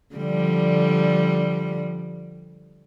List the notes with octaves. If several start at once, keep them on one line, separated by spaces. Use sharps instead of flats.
D3 F3 G3